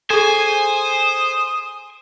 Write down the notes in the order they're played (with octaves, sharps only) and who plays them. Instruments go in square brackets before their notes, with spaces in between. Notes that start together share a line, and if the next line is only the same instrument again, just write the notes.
[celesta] G#4 A4 [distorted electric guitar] C5 [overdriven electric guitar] G#5 [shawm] D#6